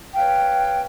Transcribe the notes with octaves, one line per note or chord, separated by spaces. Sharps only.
B4 C#5 F5 G5